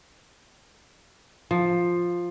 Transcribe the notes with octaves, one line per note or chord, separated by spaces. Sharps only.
F3